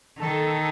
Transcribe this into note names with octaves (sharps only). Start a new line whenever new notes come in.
D#3 A4